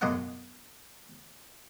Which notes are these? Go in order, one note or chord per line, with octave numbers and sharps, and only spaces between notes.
B1 F#2 D#5 F5 F#5 D6